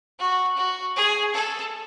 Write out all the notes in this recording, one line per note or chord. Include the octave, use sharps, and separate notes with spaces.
F#4
F#4
G#4
A4